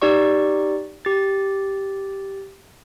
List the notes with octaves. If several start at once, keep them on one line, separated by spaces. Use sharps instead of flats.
D#4 G4 D5 C#6
G4 A6